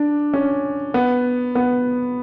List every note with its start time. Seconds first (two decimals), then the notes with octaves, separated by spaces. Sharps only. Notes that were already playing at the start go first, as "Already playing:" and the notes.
Already playing: D4
0.33 C#4
0.94 B3
1.55 B3